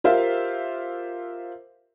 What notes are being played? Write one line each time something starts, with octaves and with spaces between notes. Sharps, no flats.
F4 G4 A#4 C5 E5 F5